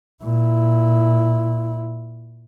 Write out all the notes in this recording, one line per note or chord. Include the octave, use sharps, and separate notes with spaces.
A#2 E4